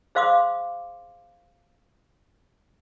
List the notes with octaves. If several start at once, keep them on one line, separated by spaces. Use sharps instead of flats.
G#4 C5 F5 C6 D6 D#6